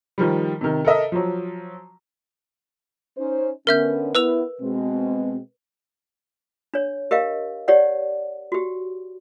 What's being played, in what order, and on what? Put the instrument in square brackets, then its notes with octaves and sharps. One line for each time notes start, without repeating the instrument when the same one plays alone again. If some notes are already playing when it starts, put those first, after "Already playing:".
[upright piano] D#3 F3 G3
C3 D#3
A4 A#4 D#5 E5
F3 F#3
[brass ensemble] C#4 D#4 C5
[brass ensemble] D3 B3 C#4 [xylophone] A#4 E5 G6
[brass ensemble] B3 E4 [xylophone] B4 E6 F7
[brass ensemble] B2 G#3 C4
[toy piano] D4 C#5
G4 A#4 D#5 F5
G4 C#5 D5 F#5
F#4 G4